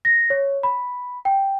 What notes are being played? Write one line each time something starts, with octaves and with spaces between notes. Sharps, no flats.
A#6
C#5
B5
G5